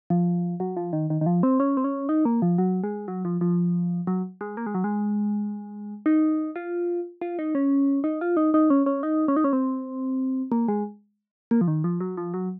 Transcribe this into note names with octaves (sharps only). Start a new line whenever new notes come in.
F3
F#3
F3
D#3
D#3
D#3
F3
C4
C#4
C4
C#4
D#4
A#3
F3
F#3
G#3
F#3
F3
F3
F#3
G#3
A#3
G#3
F#3
G#3
D#4
F4
F4
D#4
C#4
D#4
F4
D#4
D#4
C#4
C#4
D#4
C#4
D#4
C#4
C4
A#3
G#3
A#3
F3
D#3
F3
F#3
F3
F#3